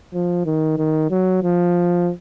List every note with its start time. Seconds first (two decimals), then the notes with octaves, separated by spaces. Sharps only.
0.13 F3
0.45 D#3
0.78 D#3
1.10 F#3
1.43 F3